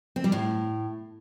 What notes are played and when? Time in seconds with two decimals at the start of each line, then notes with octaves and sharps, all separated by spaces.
0.16 C4
0.24 G3
0.32 A2